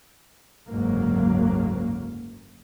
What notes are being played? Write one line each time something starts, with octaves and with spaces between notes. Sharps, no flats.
F#1 D2 G#2 F#3 A#3